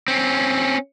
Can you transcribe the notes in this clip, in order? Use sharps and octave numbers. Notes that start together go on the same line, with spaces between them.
C4 C#4